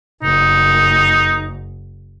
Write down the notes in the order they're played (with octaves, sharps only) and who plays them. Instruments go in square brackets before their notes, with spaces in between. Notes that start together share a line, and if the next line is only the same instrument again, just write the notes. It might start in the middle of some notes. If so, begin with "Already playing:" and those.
[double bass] F#1 [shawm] D#4